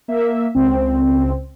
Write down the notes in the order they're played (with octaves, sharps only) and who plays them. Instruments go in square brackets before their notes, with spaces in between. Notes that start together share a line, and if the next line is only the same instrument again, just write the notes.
[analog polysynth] A#3 E5
C#2 C4